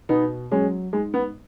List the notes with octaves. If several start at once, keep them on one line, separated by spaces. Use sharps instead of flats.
B2 B3 D#4
F#3 G#3 C#4
G#2 G#3
B3